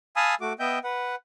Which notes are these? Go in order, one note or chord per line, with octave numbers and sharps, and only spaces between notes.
F5 G#5 A5 B5 D#6 E6
A3 F#4 D6
B3 D#5 E5 G5 G6
B4 F#5